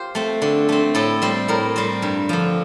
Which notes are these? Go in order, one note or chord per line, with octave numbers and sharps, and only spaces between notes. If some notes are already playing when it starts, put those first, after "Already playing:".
Already playing: F4 G4 C5
A3 C4
D3
A3 C4
A2 A4
G3 C4
A2 A#4
G3 C4
G2
D3 F3